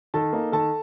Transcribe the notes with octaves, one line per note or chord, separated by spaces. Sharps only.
D#3 A4 A5
A#3 D#4
D#3 A4 A5